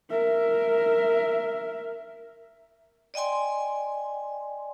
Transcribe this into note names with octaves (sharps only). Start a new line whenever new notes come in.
A#4 E5
D5 D#5 G5 G#5 C6